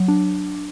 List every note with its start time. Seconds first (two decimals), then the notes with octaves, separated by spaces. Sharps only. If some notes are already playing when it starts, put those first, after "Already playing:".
Already playing: F#3
0.08 D4